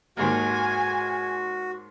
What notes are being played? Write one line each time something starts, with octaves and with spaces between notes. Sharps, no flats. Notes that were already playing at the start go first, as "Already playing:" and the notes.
D#2 G#2 D#3 F#4 G#5